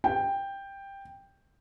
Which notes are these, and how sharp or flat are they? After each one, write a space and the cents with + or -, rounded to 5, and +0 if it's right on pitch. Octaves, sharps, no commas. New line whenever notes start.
G5 +10